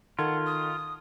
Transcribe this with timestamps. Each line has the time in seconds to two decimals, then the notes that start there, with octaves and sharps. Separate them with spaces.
0.19 D#3 F4 A4 F#5 G#6
0.46 D#6